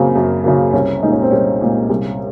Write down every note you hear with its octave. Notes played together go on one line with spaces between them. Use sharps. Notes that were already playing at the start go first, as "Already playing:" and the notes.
Already playing: F#2 C#3 F#3 A#3 C4
F#2
C#3 F#3 A#3
C2 C#4
A#2 G#3 D#4
C#4
C4
C2 C#4
A#2 G#3
C2